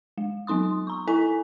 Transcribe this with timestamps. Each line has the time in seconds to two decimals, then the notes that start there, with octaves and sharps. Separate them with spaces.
0.18 G#3
0.47 F#3 B3 D#4 C6 D#6
0.87 A#5 C#6
1.08 E4 A4 G#5 B6